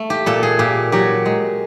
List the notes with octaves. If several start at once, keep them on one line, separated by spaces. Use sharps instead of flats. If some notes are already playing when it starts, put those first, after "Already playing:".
Already playing: A3
G4
A#2 A4
G#4
A#2 G4
F#3 G4
G#3